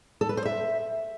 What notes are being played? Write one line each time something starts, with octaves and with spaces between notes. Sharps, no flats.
A4
B4
C5
E5